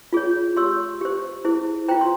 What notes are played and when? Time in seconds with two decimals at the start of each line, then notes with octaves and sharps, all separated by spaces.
0.13 F4 G#4 C#5
0.57 G4 C#5 C6 E6
1.01 G4 C5
1.45 E4 G#4 C5
1.88 F4 C5 G5 A#5
2.01 C6